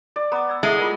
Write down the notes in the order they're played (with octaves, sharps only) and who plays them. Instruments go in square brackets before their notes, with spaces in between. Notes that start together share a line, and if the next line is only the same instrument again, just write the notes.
[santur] D5
[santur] B3 [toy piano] A#5 D6
[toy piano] D5 E6
[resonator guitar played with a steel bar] G#3 [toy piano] E4 A4 E5
[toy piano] F4 A#4 D5